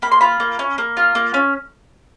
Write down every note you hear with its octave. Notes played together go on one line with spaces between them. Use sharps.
A#3 B5
C6
F4 B5
A#3
C#4
A#3
F4
A#3
C#4